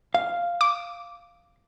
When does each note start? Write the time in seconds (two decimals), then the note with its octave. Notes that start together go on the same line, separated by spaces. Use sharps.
0.14 F5
0.61 D6